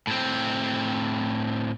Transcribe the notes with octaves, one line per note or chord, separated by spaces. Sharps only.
A2 C4